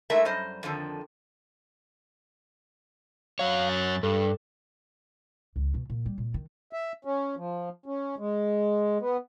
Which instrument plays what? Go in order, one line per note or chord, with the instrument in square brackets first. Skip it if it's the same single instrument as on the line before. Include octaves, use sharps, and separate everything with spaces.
[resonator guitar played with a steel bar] G#3 A3 D#4 E4 A#4 E5
F#2 G3 C5 D#5
F2 D3 D#3 F3
[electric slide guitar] F#2 F#3 C#5 [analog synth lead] F5
[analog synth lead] A6
[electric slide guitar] G2 [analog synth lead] A4
[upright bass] C#2
B2
A#2
G3
A#2
D#3
[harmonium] E5
C#4
F3
C#4
G#3
B3